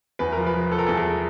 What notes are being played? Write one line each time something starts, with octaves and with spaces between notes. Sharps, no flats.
E2 B4
F3 A#4
B4
F3
F3 A4
A#4
E2 A4
G#4